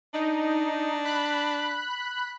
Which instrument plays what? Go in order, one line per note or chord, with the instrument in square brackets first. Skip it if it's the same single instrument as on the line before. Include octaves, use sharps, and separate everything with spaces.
[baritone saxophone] D4 [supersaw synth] D#4
[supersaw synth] B5 F#6